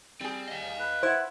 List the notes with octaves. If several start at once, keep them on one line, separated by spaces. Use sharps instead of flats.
G3 C4 G#4
D#5 F5
B4
E4 C5 F#5